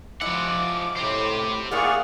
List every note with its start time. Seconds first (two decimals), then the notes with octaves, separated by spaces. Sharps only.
0.21 F3 F#3 G#3 E4 F#5 D6
0.97 A2 G4 C5
1.71 A#3 E4 F#4 G#4 D5 F#5 C#6 F6